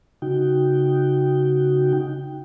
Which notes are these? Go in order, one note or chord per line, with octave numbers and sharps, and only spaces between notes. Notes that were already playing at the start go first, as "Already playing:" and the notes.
C#3 D#4 F#4 G5